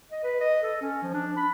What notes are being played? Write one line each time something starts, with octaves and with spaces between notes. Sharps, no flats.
D#5
B4
D#5
A4
C#4
F3
D4
B5